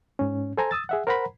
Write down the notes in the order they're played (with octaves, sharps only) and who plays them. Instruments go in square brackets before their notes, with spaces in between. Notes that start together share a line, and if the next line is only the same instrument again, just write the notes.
[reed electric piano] G#2 C#4
A4 C5 G#5 A#5
D#6 E6 A6
G#4 E5 F#5
A#4 C5 F#5 A#5 B5